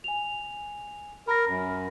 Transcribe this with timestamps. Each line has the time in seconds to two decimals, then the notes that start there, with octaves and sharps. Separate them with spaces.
0.04 G#5 F7
1.27 A#4 B5 A#6
1.47 F#2